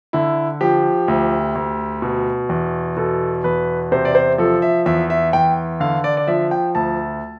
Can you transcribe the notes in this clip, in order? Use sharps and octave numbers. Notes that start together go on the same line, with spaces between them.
D3 E4
F3 G4
D2
D2
B2
E2
B2 A4
E2 B4
C3 C5
D5
C5
F3 A4
E5
E2 E5
E5
E2 G5
D3 F5
D5
D5
F3 E5
G5
D2 A5